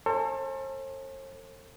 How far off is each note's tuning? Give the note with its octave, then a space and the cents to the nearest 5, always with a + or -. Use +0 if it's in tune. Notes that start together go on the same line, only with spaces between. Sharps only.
A4 +40 C5 +45 G#5 +25